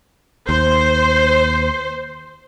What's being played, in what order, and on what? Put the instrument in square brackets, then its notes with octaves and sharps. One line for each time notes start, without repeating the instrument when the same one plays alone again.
[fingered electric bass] D#2 [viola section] C5